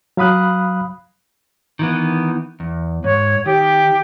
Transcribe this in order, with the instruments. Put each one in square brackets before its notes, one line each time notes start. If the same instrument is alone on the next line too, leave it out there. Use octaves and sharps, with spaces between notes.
[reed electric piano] F#3 F5 B5 D#6 F#6
[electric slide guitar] D#3 E3 B3
E2
[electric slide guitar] G#2 [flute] C#5
[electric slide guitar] D#3 [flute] G4